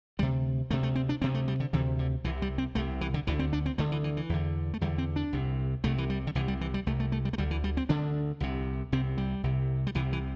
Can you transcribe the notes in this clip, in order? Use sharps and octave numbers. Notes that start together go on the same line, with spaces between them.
D2 C3 G3
D2 C3 A3
A3
C4
D4
D2 C3 C4
A3
G3
D3
D2 C3 E3
D3
C2 C3 E3
G3
C4
C2 C3 A3
E3
D3
D2 D3 E3
C4
D4
C4
D2 D3 A3
E3
E3
E3
E2 D3
A3
E2 D3 G3
C4
D4
C2 C3
C2 C3 A3
E3
G3
D3
C2 C3 E3
G3
E3
G3
C2 C3 A3
A3
A3
G3
A3
D2 D3 G3
E3
G3
C4
D2 D3 D4
C2 C3
C2 C3 C4
G3
C2 C3
G3
C2 C3 E3
E3